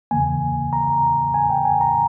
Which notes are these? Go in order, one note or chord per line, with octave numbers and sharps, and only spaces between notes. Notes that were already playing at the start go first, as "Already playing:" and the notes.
E2 C#3 E3 A#3 G#5
A#5
G#5
G5
G#5
A#5